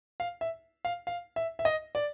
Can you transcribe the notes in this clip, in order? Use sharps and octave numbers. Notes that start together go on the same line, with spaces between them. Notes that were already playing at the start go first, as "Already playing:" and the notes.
F5
E5
F5
F5
E5
E5
D#5
D5